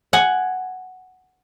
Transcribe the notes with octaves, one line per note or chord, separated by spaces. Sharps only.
F#5 G#5